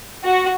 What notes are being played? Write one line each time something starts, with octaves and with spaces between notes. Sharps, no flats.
F#4